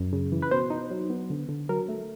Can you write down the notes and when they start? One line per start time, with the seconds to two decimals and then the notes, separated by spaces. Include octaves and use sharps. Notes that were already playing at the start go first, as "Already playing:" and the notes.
Already playing: F#2
0.13 C#3
0.32 E3
0.42 B4
0.51 B2 C5
0.70 D#4
0.91 F#3
1.10 B3
1.30 D3
1.49 D3
1.69 F#3 A#4
1.89 A3